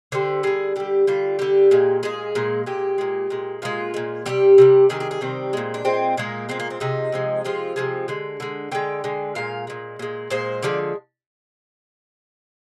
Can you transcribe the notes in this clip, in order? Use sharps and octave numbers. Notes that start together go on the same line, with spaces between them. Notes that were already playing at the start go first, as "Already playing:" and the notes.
D3 G3 C5
D3 G3 G#4
D3 G3 G4
D3 G3 F4
D3 G3 G4
A#2 G#3
A#2 G#3 G#4
A#2 G#3
A#2 G#3 G4
A#2 G#3
A#2 G#3
A#2 G#3 F4
A#2 G#3
C3 D#3 G3 G4
C3 D#3 G3
C3 D#3 G3 G#4
G#4
G#4
C3 D#3 G3 C4
A#2 G#3
D4
A#2 G#3 C4
A#2 G#3 A#3
A#2 G#3 C4
A#3
C4
C3 F3 G#3 D#4
C3 F3 G#3
C3 F3 G#3 F4
C3 F3 G#3
D3 G#3
D3 G#3
D3 G#3 G5
D3 G#3
A#2 G#3 F5
A#2 G#3
A#2 G#3
A#2 G#3 C5
D3 F3 G#3 D5